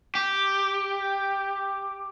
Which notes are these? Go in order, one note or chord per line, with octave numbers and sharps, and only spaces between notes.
G4